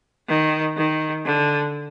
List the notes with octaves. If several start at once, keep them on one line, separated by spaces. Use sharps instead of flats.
D#3
D#3
D3